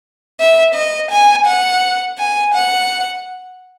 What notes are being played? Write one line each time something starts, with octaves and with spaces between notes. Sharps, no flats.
E5
D#5
G#5
F#5
G#5
F#5